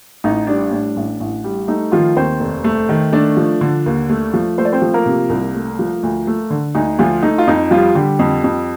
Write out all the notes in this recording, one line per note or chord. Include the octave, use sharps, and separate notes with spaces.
A1 D#4
G3 D4
A2 D4
A1
A1
G3
A3 D#4
D#3 F3 F4
D#2 C4 C5
F1
A3
D#3
A3 D4 D5
F3
D3
D#2
A3
F3
A3 C5
D5
C4 C5
F3
A#3 A#4
C3
C2
A3
F3
D2
A3
D3
D2 D#4
D2 F3 F4
A3 D#4
F4
F2 D#4
F3 G3 F4
D3 G3 G4
F2
F2